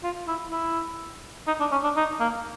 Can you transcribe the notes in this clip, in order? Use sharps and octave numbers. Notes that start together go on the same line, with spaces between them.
F4
E4
E4
D#4
D4
C#4
D4
D#4
A#3